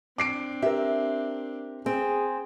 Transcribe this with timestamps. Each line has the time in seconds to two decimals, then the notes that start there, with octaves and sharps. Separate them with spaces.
0.18 C4 D4 D6 C7 D7
0.62 G4 A#4 E5
1.86 C4 G#4